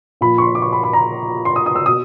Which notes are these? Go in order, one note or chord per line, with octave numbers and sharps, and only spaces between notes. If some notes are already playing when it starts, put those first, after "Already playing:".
A#2 F3 B5
C#6
C6
D6
C#6
B5
B5
A#5
C6
D#6
D#6
E6
B2 D#6